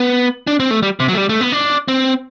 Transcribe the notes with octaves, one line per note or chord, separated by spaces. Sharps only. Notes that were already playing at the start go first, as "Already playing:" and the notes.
Already playing: B3
D4
C4
A3
G3
C3
F#3
A3
G3
A3
B3
D4
C4